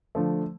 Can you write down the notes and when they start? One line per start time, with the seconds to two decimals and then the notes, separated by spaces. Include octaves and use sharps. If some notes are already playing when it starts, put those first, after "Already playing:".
0.15 D3 F3 A3